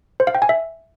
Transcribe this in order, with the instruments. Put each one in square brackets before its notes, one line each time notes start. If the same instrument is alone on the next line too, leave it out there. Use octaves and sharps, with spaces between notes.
[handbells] C5
F5
G5
G#5
E5